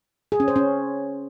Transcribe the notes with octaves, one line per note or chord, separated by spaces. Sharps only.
G#4
C#4
C5
C#4